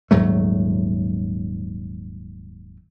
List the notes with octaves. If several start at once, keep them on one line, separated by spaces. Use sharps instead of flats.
D#1 G#2 F#3 A3